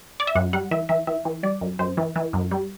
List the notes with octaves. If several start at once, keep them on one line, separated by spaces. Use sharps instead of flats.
D5
E5
F#2 F#5
G3 F#5
E3 E5
E3 E5
E3 E5
E3
G3 D5
F#2
F#2 C5
E3
E3
F#2
G3